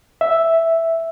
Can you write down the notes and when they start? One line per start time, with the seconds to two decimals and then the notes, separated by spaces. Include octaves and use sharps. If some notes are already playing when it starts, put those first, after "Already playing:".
0.21 E5